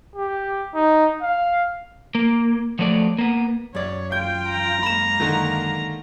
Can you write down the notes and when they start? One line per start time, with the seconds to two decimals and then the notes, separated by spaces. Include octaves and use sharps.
0.16 G4
0.74 D#4
1.22 F5
2.15 A#3
2.79 F3 F#3 A3 D5
3.19 A#3 B3
3.75 F#2 C#5 D5
4.12 F4 G5 G6
4.49 A#5
4.83 G#3 A#3 B5 E7
5.20 D3 D#3